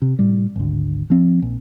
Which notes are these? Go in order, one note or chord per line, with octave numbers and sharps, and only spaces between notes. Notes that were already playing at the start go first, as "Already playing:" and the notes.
C3
A2 G3
G#1 D2
F3 C4
A#1